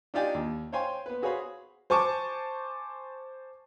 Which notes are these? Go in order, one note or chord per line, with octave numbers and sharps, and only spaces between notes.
D4 D#4 F4 G4 D5 G#5
D#2
C5 C#5 F5 G5 G#5 C6
B3 B4
F#4 G#4 C5 C#5 F5 B5
C5 G#5 A5 C#6 D6